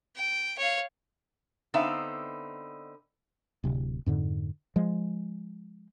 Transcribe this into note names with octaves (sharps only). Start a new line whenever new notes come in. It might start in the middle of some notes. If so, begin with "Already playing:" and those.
G5
C#5 F5
D3 B3 C4 D#4 E5 F5
D1 C3
F2 G#2 D3
F3 G#3